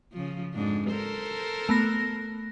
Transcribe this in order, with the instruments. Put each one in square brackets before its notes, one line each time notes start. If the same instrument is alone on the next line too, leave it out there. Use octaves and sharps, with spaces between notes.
[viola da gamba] C#3 F3
F2 G#2 D4
A4 A#4 C5
[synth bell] A3 B3 A#6